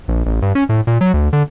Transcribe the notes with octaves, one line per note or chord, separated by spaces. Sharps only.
A#1
A1
G2
C#4
A2
A#2
F#3
D2
D3